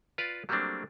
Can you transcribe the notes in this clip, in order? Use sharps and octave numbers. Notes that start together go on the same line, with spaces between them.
F4 B4 D5 F5
F#3 G3 A3 A#3 C4 D4